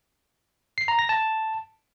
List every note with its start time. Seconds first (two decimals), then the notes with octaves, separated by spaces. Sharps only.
0.78 C7
0.88 A#5
0.99 A#6
1.09 A5